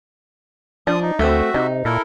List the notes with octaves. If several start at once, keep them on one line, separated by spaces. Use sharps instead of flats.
F3 D4 D#6
D#4
D2 A3 C4 F#4 E5
C3 D#4
A#2 E4 A4 A#4